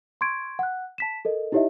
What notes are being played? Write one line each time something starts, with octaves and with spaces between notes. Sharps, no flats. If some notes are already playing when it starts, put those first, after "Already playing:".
C6 C#6 G#6 D7
F#5 F#6
A5 B6 E7
A4 A#4 D#5
D#4 E4 G4 C#5 D#5 E5